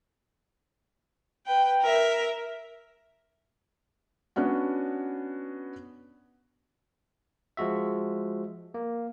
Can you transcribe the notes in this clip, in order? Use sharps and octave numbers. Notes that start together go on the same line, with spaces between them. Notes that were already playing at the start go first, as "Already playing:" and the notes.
B4 G5
A#4 E5
B3 C#4 D4 F#4
F3 G#3 F#4 E5
A#3